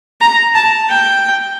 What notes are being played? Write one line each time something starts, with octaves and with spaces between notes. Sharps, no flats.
A#5
A5
G5